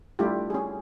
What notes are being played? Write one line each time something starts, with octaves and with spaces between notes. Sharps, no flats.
G3 A3 D4 E4 F4 G4
C#4 G#4